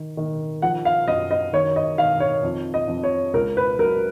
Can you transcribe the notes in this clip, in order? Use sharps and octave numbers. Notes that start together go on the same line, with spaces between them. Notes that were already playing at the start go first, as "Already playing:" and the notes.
Already playing: D#3
D#3
F3 F#5
F5
F#2 D#5
D#5
D#3 C#5
D#5
D#3 F5
C#5
F2
D#5
F2
C#5
C#2 A#4
B4
F#3 A#4